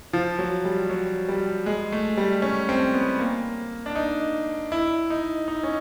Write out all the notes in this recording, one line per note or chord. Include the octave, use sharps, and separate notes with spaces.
F3
F#3
G3
F#3
G3
G#3
A3
G3
C#4
C4
B3
A#3
D4
D#4
E4
D#4
D#4
C#4